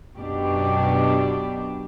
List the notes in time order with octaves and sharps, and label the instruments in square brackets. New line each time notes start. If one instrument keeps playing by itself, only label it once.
[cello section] F#2 B2 D4 G4